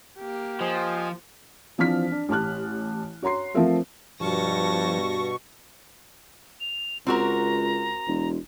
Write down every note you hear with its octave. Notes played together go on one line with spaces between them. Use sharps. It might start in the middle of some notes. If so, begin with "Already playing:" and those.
A#3 G4
F3 C5 D#5 G#5
E3 F3 C4 D4 F6 B6
D4
A1 G4 A5 F6 F#6
F#4 C#5 A#5 C6 C7
F3 A3 C4 F4 A#4 E5
G2 B2 F3 A5 C#6 A#6
F7
C#2 C4 F#4 A#4 A#5
E1